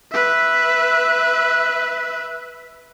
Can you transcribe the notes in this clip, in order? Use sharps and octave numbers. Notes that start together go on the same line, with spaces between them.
B4 E5